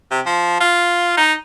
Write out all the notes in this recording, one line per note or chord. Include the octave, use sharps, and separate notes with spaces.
C3
F3
F4
D#4